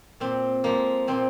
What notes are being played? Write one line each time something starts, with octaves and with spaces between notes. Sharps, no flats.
A#2 C4
F3 G#3 A#3
A#2 C4